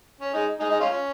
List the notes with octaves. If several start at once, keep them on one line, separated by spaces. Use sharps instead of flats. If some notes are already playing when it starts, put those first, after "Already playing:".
C#4
D#4 G#4
D#4 G#4
D#4 G#4
C#4 F4
C#4